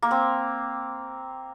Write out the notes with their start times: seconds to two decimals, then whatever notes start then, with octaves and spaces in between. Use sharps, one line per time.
0.02 A#3
0.11 C4